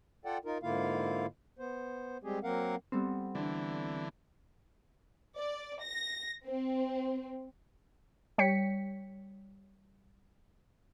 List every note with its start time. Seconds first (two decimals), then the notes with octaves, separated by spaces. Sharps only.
0.25 F4 A4 D5 F#5 G5
0.45 D#4 F4 A#4
0.63 G#2 D3 A#3 E4 F4 F5
1.59 B3 C5
2.24 G3 G#3 C4 G4 G#4
2.43 F#3 A#3 C4 A#4 F5 F#5
2.92 G3 B3 C4 A4
3.35 D3 E3 D4
5.38 D5
5.83 A#6
6.47 C4
8.38 G3 C#5 G5 B6 C#7